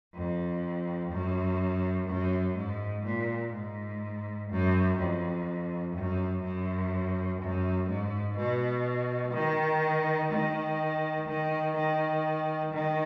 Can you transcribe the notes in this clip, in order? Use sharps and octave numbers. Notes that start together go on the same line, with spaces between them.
F2
F#2
F#2
G#2
A#2
G#2
F#2
F2
F#2
F#2
F#2
G#2
B2
D#3
D#3
D#3
D#3
D#3